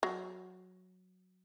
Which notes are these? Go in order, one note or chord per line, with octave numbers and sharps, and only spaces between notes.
F#3